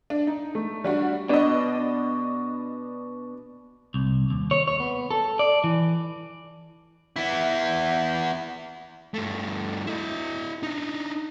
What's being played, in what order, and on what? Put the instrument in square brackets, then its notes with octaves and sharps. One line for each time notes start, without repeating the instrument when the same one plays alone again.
[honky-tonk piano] D4
D#4
A3
G3 D4 F#4
[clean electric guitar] B2 [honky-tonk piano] D4 D#5
[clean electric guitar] C2
D#2
C#5
C#5
B3
A4
D5
E3
[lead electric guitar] B3 E4
G2 A3
E4 D#5
D4 D#4